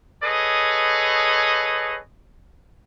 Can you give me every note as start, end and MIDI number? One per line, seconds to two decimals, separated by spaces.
0.23 1.98 68
0.23 1.98 69
0.23 1.98 71
0.23 1.98 73
0.23 1.98 75